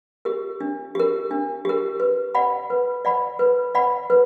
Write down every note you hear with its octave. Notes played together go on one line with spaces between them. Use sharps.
G4 A#4
D4
G4 A#4
D4
G4 A#4
B4
D5 F#5 B5
B4
D5 F#5 B5
B4
D5 F#5 B5
B4